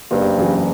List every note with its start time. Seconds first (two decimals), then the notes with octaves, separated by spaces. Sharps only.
0.11 F#1 G2
0.37 E2 C#3 F#3